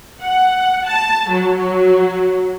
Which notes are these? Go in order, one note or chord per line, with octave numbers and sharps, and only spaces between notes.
F#5
A5
F#3